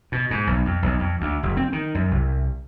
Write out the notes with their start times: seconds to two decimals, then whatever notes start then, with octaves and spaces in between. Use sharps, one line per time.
0.12 B2
0.31 G#2
0.47 B1
0.65 F2
0.82 B1
0.99 F2
1.21 D2
1.43 F#1
1.57 C4
1.73 D#3
1.94 F#2
2.11 C2